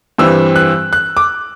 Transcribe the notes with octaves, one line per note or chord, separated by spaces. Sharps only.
G2 E3 G3 C4 E6
F#6
F#6
D6